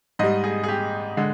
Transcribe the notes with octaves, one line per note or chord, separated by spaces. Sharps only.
G#2 G3 D#5
G#4
G#4
G4
D3 G#3